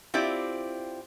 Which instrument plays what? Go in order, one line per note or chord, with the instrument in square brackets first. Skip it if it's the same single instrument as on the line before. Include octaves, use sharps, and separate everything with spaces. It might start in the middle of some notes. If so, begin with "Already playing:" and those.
[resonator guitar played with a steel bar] C4 E4 F4 G4 D5